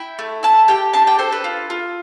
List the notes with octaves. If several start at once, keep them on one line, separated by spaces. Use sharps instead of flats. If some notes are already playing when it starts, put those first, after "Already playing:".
Already playing: E4 G5
A3
E4 A5
G4 G5
D4 A5
G5
A4 C5
B4
F4
F4